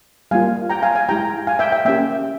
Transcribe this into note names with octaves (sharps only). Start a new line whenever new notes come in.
G3 A#3 F4 F5 G#5
G5 A#5
F5 G#5
F5 G#5
G#3 E4 G4 G5 A#5
F5 G#5
E5 G5
E5 G5
A#3 C#4 G4 E5 G5